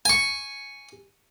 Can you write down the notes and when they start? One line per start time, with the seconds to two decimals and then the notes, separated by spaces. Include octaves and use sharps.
0.05 G#5 C#6